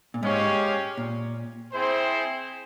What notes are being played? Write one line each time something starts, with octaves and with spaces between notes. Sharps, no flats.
A#2
G#2 G#3 C#4 G4 C#5 F5
A#2
C4 E4 G#4 C5